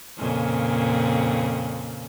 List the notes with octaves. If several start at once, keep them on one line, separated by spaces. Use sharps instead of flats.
F2 A#2 C#3